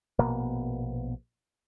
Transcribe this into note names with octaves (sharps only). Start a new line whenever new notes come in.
A#1 B2 A#3 B3